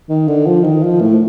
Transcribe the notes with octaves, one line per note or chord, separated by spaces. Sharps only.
D#3
D3
F3
D#3
F3
A2